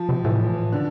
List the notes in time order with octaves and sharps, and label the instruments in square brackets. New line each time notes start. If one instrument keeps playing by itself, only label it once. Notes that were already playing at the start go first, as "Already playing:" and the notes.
Already playing: [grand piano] F3
[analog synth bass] C3
[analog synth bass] A2 [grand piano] E3
[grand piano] D3